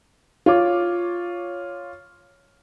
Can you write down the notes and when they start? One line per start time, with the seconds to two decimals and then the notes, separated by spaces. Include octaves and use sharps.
0.46 F4 C#5 D6